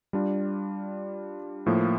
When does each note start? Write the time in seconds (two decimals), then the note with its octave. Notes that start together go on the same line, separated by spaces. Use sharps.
0.13 G3 D4 F4
1.66 A2 F3 A#3